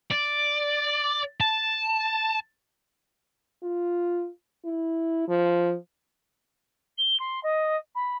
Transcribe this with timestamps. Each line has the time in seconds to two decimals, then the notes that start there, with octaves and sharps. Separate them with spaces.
0.11 D5
1.41 A5
3.63 F4
4.65 E4
5.28 F3
6.98 G7
7.20 C6
7.43 D#5
7.95 B5